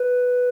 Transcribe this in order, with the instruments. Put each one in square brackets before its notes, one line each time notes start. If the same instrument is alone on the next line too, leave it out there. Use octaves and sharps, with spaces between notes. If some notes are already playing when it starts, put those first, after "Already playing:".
Already playing: [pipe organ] B4